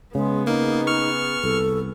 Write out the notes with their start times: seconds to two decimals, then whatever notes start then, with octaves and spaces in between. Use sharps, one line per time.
0.15 C#3 G#3 B3 G#4
0.47 A#3 D#4
0.87 C#6 F6
1.44 C2 A4